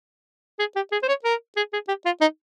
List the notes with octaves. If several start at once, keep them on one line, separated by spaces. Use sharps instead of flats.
G#4
G4
G#4
C5
C#5
A#4
G#4
G#4
G4
F4
D#4